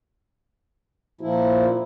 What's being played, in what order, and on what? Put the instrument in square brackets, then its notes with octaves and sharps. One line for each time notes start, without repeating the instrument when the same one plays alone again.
[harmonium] A#2 F3 E4